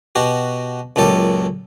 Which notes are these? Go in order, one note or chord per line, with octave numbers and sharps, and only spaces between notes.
B2 F#4 G4
C#2 F#2 A#2 G4 A4